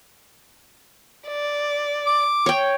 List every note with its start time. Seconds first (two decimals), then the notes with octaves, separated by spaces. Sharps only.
1.27 D5
2.07 D6
2.46 C#5 G5